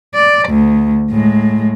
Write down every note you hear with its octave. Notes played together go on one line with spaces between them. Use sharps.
D5
D2
A2 G#3